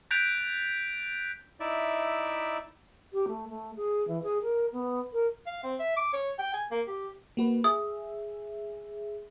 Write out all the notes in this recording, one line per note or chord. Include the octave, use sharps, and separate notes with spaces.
F#6 G6 A6 B6 D7 F7
D#4 E4 D5 E5
G4
A3
A3
G#4
E3
G#4
A#4
B3
A#4
F5
C4
E5
D6
C#5
G5
G#5
A#3
G4
A#3 F#4 B4
G#4 E5 D#6